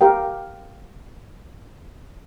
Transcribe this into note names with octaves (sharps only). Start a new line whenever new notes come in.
G4 A#4 F5 G5